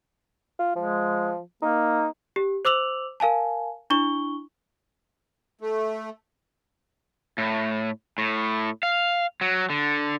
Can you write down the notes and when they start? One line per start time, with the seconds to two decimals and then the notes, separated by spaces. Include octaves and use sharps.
0.59 F4
0.76 F3 G#3
1.62 A#3 D#4
2.36 G4
2.65 C5 D6 E6 F7 F#7
3.20 A#4 F5 G#5 A5
3.90 D4 E4 C#6 G7
5.61 A3
7.38 A2
8.18 A2
8.83 F5
9.41 F#3
9.70 D3